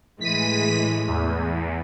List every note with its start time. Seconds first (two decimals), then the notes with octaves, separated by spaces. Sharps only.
0.21 A2 E3 G#3 B6 D#7
1.07 E2